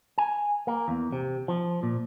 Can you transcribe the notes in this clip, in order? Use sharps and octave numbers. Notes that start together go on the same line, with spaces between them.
G#5
A#3
E2
C3
F3
A#2